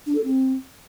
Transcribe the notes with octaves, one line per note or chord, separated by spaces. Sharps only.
D4
A4
C4